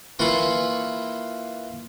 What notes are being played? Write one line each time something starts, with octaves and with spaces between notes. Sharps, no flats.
E3 A#3 F4 B5 C#6